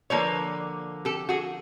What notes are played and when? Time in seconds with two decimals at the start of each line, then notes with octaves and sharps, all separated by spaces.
0.10 D3 F3 A#3 B4 C#5
1.05 G4 A4
1.29 F#4 G#4